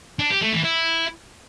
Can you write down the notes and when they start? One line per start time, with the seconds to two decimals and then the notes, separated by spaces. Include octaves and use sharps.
0.19 D4
0.30 G4
0.42 A3
0.53 E3
0.64 E4